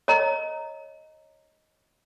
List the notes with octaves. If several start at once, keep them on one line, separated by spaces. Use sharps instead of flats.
C#5 D#5 A#5